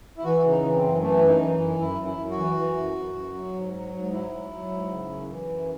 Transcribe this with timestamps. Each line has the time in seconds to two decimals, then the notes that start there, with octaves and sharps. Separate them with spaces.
0.18 E4
0.24 E3 F#4
0.44 C#3
0.50 D#4
0.63 E3
0.76 C4
0.82 F#2
1.02 E3 A3
1.21 F#2
1.28 D#4
1.40 E3
1.60 F#2
1.79 F#2 E4
1.99 F#2
2.04 E4
2.17 F#2
2.31 F#4
2.37 E3
2.57 E3
2.77 F#2
2.96 F#2
3.14 F#2
3.34 F#3
3.54 G#2
3.73 F#3
3.93 G#2
4.12 F#3 E4
4.32 F#3
4.51 F#3
4.70 G#2
4.89 C#3
5.09 F#2
5.29 E3
5.48 F#2